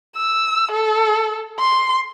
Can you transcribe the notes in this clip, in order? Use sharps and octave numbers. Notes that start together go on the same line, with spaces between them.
E6
A4
C6